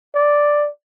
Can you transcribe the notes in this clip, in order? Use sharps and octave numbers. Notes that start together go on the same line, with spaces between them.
D5